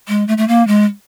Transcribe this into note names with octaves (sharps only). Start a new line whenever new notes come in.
G#3
A3
A3
A#3
G#3